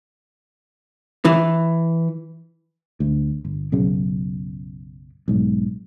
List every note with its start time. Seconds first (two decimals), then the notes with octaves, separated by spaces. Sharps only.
1.25 E3
3.00 D2
3.45 G1
3.72 B1 F#2 C#3
5.28 B1 G#2